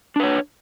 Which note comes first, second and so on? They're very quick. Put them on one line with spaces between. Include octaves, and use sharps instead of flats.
D4 B4 C#5